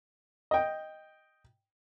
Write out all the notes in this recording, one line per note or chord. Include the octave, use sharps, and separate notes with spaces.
D#5 G5